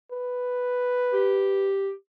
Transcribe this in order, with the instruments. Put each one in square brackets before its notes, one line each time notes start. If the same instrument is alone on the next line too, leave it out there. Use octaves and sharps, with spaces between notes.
[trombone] B4
[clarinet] G4